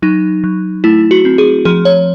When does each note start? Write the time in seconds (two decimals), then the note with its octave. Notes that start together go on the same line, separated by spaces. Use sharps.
0.02 F#3 D#4
0.44 F#3
0.84 A3 E4
1.11 F#4
1.25 C4
1.38 G#4
1.65 F3 G#4
1.85 C#5